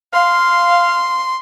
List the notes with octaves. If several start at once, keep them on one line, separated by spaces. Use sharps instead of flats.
F5 C6